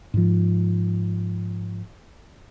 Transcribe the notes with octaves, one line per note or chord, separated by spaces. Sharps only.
G#2 F3